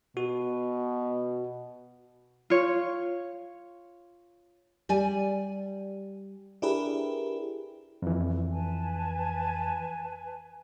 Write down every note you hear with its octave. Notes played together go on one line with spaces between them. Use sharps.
B2 F#4
F4 C#5
G3 D5 G#5
D4 E4 G4 G#4 A#4 B4
F2 E3
B4 G#5 A5